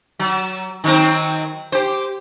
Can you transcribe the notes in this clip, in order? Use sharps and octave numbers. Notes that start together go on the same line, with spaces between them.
F#3
D#3 F#3 C4
G4 C5